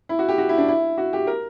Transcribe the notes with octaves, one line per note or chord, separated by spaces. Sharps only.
E4
F#4
G4
F#4
E4
D4
E4
F#4
G4
A#4